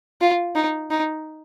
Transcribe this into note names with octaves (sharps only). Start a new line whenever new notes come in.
F4
D#4
D#4